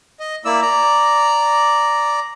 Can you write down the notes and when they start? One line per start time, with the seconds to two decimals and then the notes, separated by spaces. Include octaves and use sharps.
0.20 D#5
0.45 A#3 E4 D5 E6
0.62 D5 A#5